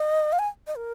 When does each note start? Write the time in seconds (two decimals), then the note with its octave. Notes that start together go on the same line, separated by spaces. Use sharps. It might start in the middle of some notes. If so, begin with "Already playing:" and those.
Already playing: D#5
0.33 F5
0.39 G#5
0.67 D#5
0.76 A#4